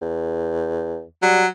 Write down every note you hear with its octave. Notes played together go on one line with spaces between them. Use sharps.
E2
F#3 G3